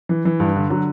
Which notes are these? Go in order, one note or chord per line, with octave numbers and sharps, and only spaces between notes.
E3
E3
G2
D3
F#3